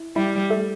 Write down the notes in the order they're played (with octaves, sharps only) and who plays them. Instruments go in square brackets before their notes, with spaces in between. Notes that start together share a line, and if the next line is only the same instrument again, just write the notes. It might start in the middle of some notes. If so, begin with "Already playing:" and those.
Already playing: [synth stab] E4
[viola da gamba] G3 [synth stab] E4
[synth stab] A3